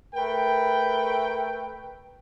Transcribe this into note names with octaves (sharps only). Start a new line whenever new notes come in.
A3 A#4 B4 G5